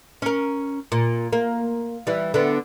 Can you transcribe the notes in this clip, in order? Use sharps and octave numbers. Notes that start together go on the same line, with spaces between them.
C#4 A#4
A#2
A#3
E3 G3
D3 B3